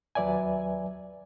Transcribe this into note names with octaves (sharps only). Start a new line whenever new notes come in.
D#2 F#3 B4 D5 E5 G#5